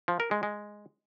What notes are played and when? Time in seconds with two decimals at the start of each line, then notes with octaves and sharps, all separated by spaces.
0.08 F3
0.20 A#4
0.31 G#3
0.43 G#3